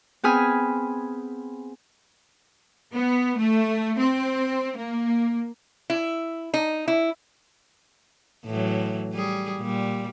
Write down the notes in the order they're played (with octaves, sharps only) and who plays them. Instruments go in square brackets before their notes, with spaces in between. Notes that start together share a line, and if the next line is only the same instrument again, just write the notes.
[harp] B3 C4 G#4 G#5 B5 F6
[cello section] B3
A3
C4
A#3
[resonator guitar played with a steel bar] E4
D#4
E4
[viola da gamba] A2 E3 F#3
G3 G#4
A#2 G3